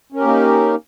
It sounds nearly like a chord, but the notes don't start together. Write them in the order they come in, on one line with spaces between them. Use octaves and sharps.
C#4 A#4 G4 A#3 D#4